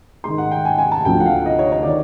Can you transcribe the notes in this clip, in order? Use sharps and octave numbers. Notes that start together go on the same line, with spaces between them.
G#2 D#3 C6
F#5
G5
G#5
G#5
A5
D2 D3 F3 G5
F#5
F5
D#5
C#5
C#5
D#3 D5